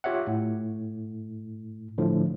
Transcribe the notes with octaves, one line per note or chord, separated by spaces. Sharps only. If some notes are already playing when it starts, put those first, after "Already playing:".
F4 G4 C#5 E5 F#5
A2
A2 D3 F3